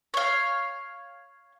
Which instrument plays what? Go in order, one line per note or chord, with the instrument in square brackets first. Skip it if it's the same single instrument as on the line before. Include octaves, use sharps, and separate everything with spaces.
[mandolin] C#5 F5